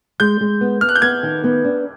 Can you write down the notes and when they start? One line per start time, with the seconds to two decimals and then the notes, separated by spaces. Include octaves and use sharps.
0.20 G#3 G6
0.41 G#3
0.61 B3
0.81 B3 F6
0.89 F#6
0.95 G6
1.02 B3 G#6
1.23 D#3
1.44 B3
1.64 D4